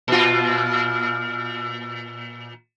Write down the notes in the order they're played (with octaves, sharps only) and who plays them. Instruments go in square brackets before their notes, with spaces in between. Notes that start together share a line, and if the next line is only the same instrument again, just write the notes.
[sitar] A#2 F4